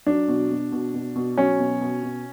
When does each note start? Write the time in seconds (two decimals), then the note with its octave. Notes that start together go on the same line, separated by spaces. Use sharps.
0.06 F#3 D4
0.28 B2
0.51 B2
0.72 B2
0.94 B2
1.16 B2
1.38 F#3 C#4
1.59 B2
1.81 B2
2.03 B2